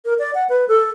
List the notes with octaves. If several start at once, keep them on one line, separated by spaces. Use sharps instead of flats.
A#4
D5
F#5
B4
A4